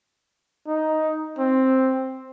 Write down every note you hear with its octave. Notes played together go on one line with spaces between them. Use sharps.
D#4
C4